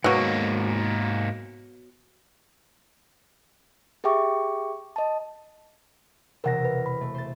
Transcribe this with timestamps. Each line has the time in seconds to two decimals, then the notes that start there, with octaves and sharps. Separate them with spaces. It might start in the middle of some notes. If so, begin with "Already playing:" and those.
0.04 G#2 B2 F#3 A#3
4.04 G4 G#4 E5 G5 C#6 D6
4.96 D#5 A5
6.44 E1 C3 A#4 F#5 A#6
6.65 B4
6.86 B5
7.01 A3
7.14 C5 A6